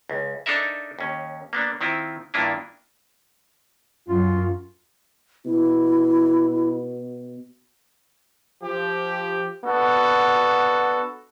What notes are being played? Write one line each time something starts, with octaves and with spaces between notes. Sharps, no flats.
C#2
D4 D#4 A4 A#4 E5
D#2 C#4
A#3 B3 D4
D#3 C4 E4 F4
G2 D#3 A#3 D4 E4 F4
F#2 F4
B2 E4
F3 G4
B3 D4 F#4 A4